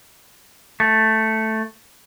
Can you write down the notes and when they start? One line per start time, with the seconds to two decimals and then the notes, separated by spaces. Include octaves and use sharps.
0.80 A3